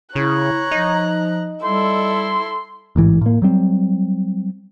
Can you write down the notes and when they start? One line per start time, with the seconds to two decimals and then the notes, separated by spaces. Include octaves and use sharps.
0.15 C#3 E4 C#5 A#5 F#6
0.71 F3 D#4
1.64 G3 E4 A4 C6
2.96 A1 G#2 E3
3.21 A2 A#3
3.42 F#3 G3 C4